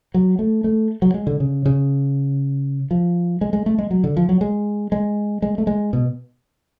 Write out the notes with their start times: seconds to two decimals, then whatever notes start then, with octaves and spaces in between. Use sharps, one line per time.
0.14 F#3
0.39 A3
0.64 A3
1.02 F#3
1.14 G#3
1.27 D3
1.40 C#3
1.66 C#3
2.91 F3
3.41 G#3
3.53 G#3
3.66 A3
3.79 G#3
3.91 F#3
4.04 D3
4.17 F3
4.29 F#3
4.41 G#3
4.92 G#3
5.42 G#3
5.58 A3
5.67 G#3
5.93 B2